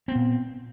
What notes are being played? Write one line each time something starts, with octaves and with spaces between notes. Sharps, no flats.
A#2 B3 C4